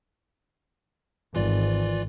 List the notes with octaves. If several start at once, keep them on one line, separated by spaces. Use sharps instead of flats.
G#1 E3 F4 D5